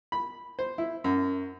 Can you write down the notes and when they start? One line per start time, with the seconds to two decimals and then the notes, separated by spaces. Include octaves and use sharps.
0.12 B5
0.59 C5
0.78 E4
1.04 F#2